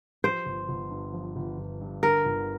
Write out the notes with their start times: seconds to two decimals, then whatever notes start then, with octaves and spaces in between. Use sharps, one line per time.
0.24 F3 C5
0.46 G1
0.69 G1
0.91 G2
1.13 F3
1.36 G1
1.58 G1
1.81 G2
2.02 D3 A#4
2.26 G1